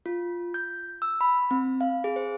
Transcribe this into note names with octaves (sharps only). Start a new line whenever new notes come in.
F4
G6
E6
B5
C4
F5
G#4
C5